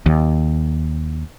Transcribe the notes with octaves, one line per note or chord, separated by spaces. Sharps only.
D#2